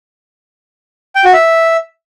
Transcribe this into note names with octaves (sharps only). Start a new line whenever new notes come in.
G5
F#4
E5